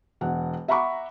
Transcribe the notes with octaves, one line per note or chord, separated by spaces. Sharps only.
E1 F#5
E5 F#5 A#5 B5 C#6 D6